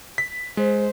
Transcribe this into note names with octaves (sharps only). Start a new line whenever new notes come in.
B6
G#3 C5